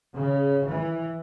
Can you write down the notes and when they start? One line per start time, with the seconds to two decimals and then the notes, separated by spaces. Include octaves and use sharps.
0.14 C#3
0.68 E3